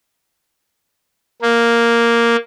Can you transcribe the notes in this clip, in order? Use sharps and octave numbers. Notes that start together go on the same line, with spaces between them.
A#3